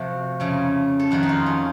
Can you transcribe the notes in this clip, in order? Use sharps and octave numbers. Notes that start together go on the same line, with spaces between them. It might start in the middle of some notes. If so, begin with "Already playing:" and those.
Already playing: C3 F3 A3 F#4
F2 C#3 A3
A4
F2 D#3 A3 F#4
D#4
F4
C#4